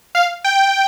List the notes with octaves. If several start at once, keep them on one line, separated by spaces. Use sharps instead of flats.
F5
G5